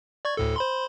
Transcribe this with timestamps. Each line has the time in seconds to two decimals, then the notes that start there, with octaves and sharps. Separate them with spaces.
0.25 D5 C#6 G#6
0.37 D2 A2 A4
0.56 C5 B5 C6